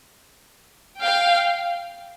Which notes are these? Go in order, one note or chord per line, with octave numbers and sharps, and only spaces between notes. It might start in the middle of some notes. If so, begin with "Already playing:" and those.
F5 G5